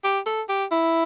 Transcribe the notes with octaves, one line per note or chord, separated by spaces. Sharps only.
G4
A4
G4
E4